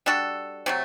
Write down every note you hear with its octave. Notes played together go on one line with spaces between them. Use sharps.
G3 D4 F#4 A4
C3 F#3 A3